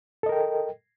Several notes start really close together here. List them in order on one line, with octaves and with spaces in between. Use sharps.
A4 D#5 A#4 G5